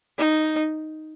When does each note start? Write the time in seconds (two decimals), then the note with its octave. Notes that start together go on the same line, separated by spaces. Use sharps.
0.18 D#4